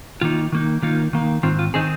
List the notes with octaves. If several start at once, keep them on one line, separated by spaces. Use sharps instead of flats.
D#3 A#3 D#4 F4
D#3 A#3 D#4
D#3 A#3 D#4 F4
D#3 A#3 D#4
G#2 D#3 C4 F4
F4
D#3 C4 D#4 G#4